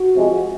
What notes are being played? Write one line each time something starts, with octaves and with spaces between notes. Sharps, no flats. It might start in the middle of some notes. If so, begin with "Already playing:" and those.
Already playing: F#4
C3 F3 G#3